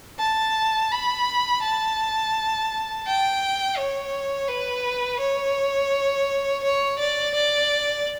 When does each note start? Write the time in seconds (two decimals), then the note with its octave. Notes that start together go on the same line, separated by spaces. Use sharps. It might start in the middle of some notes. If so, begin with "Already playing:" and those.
0.20 A5
0.91 B5
1.63 A5
3.06 G5
3.77 C#5
4.49 B4
5.20 C#5
6.64 C#5
6.99 D5
7.35 D5